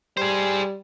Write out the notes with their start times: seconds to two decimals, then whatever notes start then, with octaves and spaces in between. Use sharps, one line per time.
0.17 G3 G#4 C5